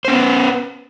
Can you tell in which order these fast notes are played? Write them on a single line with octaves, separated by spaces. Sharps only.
C5 C#4 B3 B4